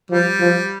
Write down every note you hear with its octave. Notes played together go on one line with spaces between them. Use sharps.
F3 G3
F3